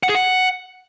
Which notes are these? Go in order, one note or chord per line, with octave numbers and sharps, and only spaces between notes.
F#5
G#4
F#5